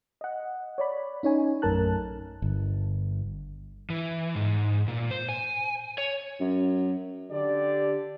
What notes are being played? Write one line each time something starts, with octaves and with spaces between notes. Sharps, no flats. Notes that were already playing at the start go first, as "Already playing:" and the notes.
D#5 F#5
C#5 D5 B5
C#4 D#4 C#5 G#5
A#1 F#2 A3 A#4 A5 F#6
G1
E3
G#2
A#2
C5
G#5
C#5
F#2
D3 G4 D5